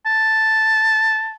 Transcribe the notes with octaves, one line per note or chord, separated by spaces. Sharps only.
A5